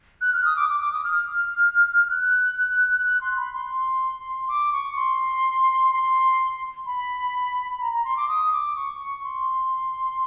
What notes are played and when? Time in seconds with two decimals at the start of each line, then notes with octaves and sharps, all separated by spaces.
0.21 F#6
0.33 F6
0.45 D#6
0.56 D6
0.69 D6
0.80 D6
0.92 D#6
1.04 F6
1.16 F6
2.11 F#6
3.06 F#6
3.21 C6
3.37 B5
3.53 C6
4.48 D6
4.72 C#6
4.96 C6
5.91 C6
6.86 B5
7.81 A#5
7.93 A#5
8.05 C6
8.17 D6
8.28 D#6
8.52 D6
8.76 C#6
9.24 C6